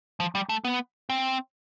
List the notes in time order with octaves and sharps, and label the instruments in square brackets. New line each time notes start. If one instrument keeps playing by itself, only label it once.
[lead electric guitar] F3
G3
A3
B3
C4